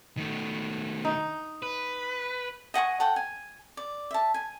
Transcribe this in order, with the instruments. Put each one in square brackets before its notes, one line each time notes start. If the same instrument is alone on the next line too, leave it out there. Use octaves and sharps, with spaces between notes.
[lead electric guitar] D#3 A3
[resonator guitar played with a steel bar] D#4
[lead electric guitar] B4
[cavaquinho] D#5 F#5 G#5 C#6
A4 F#5 G5
G#5
D5
E5 A5
G#5